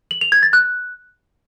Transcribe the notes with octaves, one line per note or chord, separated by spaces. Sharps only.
F#7
F7
G#6
A6
F#6